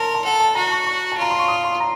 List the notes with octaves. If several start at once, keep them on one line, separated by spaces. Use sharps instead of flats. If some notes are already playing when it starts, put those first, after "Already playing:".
Already playing: A#4 A5 C6
A5
A4 F#5
A5
F#4 A#5
C#6
C#6
A5
F4 A#5
C6
C#6
D#6
C6
A#5